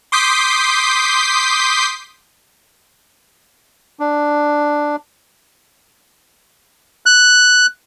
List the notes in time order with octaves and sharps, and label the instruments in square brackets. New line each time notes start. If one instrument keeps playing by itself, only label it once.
[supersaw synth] C6 D6 D#6 G6 B6 C7
[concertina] D4
F#6